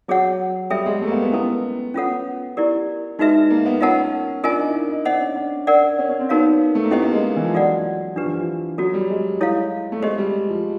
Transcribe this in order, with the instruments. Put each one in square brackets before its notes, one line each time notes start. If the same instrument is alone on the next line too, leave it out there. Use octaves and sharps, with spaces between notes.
[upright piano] F#3 [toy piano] G#4 C#5 F#5
[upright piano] G3 [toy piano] A4 C#5 E5 G5
[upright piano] G#3
A3
A#3
B3
B3
[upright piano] B3 [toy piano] C#4 E4 A4
[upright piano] B3 [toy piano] C#4 F4 A4 C#5 F#5
[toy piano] E4 G4 A#4 D5
[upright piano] G#3 [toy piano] D#4 F#4 B4 E5
[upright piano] A#3
B3
[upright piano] C#4 [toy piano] F4 A#4 D#5 F#5 A5
[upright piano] D4 [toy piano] F4 A#4 D#5 G#5
[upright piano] D#4
E4
D#4
E4
D#4
[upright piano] D4 [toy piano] C5 D#5 F#5
[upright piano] C#4
D4
[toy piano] A#4 D5 F#5
[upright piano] C#4
C#4
C4
[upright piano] B3 [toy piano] D#4 F#4 A#4 C#5 F5
[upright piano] A3
A#3
[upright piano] B3 [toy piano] C#4 E4 G4 C5 D#5
[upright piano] A#3
G#3
E3
F3
[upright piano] F#3 [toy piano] F4 A4 D5 F#5
[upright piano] F3 [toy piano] D4 G4 B4
[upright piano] E3
F3
[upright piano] F#3 [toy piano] F#4 A4 C#5
[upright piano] G3
G#3
[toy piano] E4 A4 C#5 F5
[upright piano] A3
[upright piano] G#3 [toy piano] G4 C5 D#5
[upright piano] G3
F3